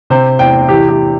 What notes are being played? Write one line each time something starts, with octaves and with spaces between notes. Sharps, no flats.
C3 C5
E2 G5
E3 G4
G4